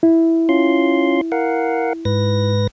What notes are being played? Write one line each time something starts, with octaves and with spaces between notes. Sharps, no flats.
E4
C#4 F4 C6
A#4 F5 F#5
G#2 B4 A#6